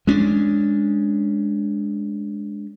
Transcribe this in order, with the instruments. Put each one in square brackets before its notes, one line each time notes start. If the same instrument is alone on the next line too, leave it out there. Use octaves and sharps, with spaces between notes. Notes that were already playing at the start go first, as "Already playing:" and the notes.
[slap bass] G#3 C#4 D4